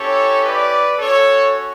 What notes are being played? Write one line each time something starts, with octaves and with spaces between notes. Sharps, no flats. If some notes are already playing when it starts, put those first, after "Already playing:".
Already playing: C#4 E4 G4 A4 C#5
B4 D5
C#4 F#4 A4 C#5